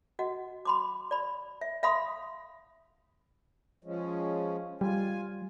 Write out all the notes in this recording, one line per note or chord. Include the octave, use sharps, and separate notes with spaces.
F#4 D#5 F#5
B5 C6 D6
D5 B5
E5
E5 F5 B5 C6 D#6
F3 G#3 C#4
G3 F4 G#5